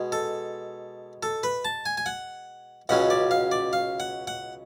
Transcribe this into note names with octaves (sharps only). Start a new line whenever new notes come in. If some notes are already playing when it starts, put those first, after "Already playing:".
Already playing: B2 G#3
A4
A4
B4
A5
G#5
G#5
F#5
C#2 B2 F#3 C#4 F#5
D5
F5
D5
F5
F#5
F#5